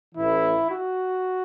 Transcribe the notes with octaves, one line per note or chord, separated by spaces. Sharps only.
A1 A2 E3 E4
F#4